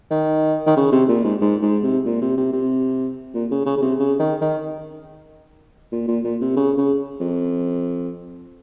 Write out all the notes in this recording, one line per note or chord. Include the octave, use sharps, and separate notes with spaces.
D#3
D#3
C#3
C3
A#2
G#2
G#2
G#2
C3
A#2
C3
C3
C3
A#2
C#3
C#3
C#3
C3
C#3
D#3
D#3
A#2
A#2
A#2
C3
C#3
C#3
F2